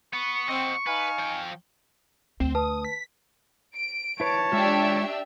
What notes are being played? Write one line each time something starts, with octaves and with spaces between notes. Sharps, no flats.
B3 C#6
C4 D#5 F#5
D#4 B4 F5 G#5
F3 G5
D2 C4
B4 A5 D#6
B6
D7
E4 B4 C#5 A5
G#3 D4 F4 G4 E5